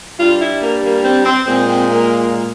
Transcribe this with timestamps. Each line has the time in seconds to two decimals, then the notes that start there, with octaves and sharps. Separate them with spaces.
0.19 G2 G3 F4
0.40 E4
0.62 A#3
0.83 A#3
1.04 C4
1.25 C4
1.46 A#2 G#3 C4
1.68 C4
1.88 A#3